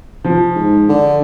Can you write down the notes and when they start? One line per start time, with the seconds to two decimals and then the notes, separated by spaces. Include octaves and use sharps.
0.24 F3
0.56 G#2
0.89 D3